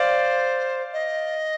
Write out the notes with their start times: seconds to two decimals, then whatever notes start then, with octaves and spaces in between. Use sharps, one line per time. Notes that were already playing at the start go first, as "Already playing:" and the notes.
Already playing: C5 D5 F5
0.93 D#5